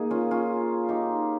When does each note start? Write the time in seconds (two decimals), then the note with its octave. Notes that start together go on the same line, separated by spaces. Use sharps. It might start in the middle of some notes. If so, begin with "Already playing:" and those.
Already playing: A#3 D#4 G#4
0.11 C#4 F4
0.31 C#4 F4
0.89 D#4 G4